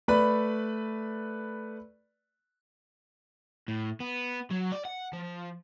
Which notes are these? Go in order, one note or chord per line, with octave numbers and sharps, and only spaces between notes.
A3 B4 D5 B5
A2
B3
F#3
D5
F#5
F3